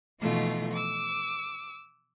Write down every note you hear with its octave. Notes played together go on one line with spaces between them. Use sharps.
B2 E3 F3 A3 D#4 F4
D6 E6